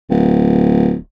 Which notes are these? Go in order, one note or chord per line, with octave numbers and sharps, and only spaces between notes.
D1